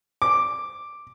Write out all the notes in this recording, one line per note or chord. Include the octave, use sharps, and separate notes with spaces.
D6